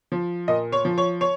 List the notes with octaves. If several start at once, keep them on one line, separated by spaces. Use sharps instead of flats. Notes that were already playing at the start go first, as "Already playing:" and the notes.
F3
A#2 D#5
C#5
F3
C#5
C#5